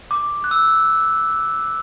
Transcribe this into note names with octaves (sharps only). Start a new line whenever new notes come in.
D6
F#6
E6